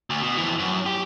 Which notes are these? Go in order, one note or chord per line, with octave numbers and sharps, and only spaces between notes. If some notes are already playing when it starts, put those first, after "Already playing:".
D2
B2
F2 E3
F#2
G4